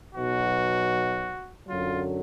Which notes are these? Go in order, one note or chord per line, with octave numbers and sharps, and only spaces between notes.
B1 B2 F#3 F#4
F#2 D3 F#3 F4